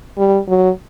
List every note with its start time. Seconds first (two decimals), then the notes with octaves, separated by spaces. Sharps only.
0.18 G3
0.48 F#3